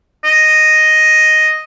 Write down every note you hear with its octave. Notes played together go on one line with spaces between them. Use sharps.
D#5